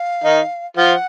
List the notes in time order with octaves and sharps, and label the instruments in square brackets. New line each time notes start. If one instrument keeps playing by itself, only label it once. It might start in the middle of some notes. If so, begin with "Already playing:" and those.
Already playing: [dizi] F5
[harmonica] D#3 D#4
[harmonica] F3 F4 [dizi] F#5